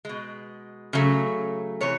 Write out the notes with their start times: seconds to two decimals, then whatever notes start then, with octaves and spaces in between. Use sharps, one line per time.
0.05 B2 G#3
0.93 C#3 F#3 A3
1.81 C3 E3 C#5